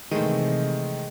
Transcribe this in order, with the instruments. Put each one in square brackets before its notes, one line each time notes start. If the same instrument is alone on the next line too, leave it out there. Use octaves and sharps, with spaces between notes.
[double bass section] C3 E3 [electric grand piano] D#3 A3 [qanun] G#3 C5